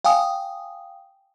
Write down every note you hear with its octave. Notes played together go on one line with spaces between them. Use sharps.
F5 G5 G#5 D#6